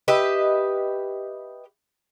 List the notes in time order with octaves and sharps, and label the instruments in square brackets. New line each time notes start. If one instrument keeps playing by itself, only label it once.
[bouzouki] G4 B4 D#5 E5